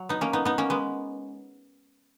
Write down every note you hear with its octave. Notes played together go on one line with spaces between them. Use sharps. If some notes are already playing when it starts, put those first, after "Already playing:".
Already playing: F#3
B3 D#4
A#3 C#4
B3 D#4
B3 D#4
A#3 C#4
G#3 B3